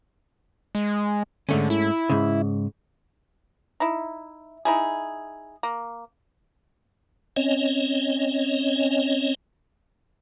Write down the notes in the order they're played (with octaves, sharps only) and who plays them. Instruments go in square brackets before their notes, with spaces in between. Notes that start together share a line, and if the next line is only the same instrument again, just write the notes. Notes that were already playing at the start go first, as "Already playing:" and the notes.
[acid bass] G#3
[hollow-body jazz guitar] G#2 A3 C#4 [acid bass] D3
[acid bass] E4
[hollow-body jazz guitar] G#2 C#3
[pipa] D#4 E4
D#4 E4 G#4
A#3
[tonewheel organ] C4 C#4 C#5 D#5